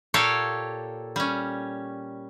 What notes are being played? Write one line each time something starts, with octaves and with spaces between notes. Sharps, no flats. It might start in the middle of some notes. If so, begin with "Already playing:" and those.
A#2 G4 A4 C#5 F5
G3 C#4